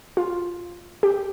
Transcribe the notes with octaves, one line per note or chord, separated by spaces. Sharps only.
F4
G4